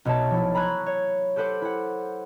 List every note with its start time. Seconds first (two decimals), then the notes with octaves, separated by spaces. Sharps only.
0.05 B1 B2 C#5 E5 A5
0.30 F3 F#3 A3 E4
0.55 A#5 B5 C#6 E6 F#6 G#6
0.86 C#5
1.36 G4 A4 B4 C5 F#5 D6
1.62 E4 F#5